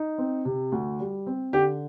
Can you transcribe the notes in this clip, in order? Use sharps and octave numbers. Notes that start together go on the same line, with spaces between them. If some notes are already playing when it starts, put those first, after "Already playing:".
Already playing: D#4
C4
C3
D2
G3
C4
D3 G4